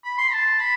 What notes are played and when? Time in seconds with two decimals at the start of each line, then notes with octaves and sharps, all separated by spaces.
0.04 B5
0.18 C6
0.32 A5
0.60 B5